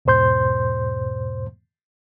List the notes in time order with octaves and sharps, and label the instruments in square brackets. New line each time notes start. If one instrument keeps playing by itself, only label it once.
[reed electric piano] E2 G#2 B2 C5 C6 G6